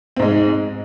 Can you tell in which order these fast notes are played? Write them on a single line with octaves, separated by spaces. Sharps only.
C4 G#2 G#3